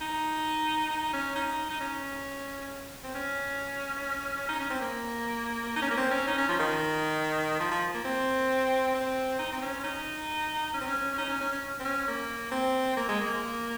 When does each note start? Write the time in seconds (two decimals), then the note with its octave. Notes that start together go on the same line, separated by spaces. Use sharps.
0.01 D#4
0.90 D#4
1.13 C#4
1.36 D#4
1.70 D#4
1.80 C#4
3.04 C4
3.15 C#4
4.49 D#4
4.60 C#4
4.70 C4
4.81 A#3
5.76 D#4
5.82 C#4
5.91 A#3
5.97 C4
6.11 C#4
6.27 D#4
6.38 C#4
6.49 F3
6.60 D#3
7.60 F3
7.71 F3
7.94 A#3
8.05 C4
8.95 C4
9.39 D#4
9.52 C4
9.62 C#4
9.84 D#4
10.74 C#4
10.81 C4
10.87 C#4
11.13 C#4
11.18 D#4
11.29 C#4
11.41 C#4
11.52 C#4
11.80 C4
11.85 C#4
12.08 A#3
12.52 C4
12.97 A#3
13.08 G#3
13.21 A#3